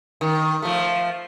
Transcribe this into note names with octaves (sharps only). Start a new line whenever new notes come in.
D#3
F3 A3